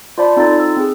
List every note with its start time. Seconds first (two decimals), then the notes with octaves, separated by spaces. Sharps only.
0.18 F4 C5 D5 A5 B5
0.36 C4 D#4 F4 A4 A6
0.60 E6
0.77 C4 G#4